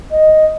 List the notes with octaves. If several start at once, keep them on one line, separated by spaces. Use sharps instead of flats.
D#5